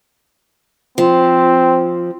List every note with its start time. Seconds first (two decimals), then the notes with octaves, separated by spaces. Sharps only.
0.98 F3 C4